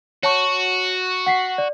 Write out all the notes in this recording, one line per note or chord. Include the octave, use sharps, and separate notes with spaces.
F#4 C#5 A5 C#6
F#5 B6 C7
D5